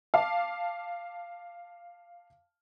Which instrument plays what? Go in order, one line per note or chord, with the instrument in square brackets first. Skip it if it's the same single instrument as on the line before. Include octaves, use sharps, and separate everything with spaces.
[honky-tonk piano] F5 A5 D6